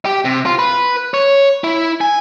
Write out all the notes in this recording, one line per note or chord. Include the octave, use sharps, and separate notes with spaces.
G4
C3
F4
B4
C#5
E4
G#5